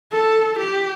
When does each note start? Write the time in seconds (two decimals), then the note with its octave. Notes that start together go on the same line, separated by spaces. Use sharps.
0.12 A4
0.58 G4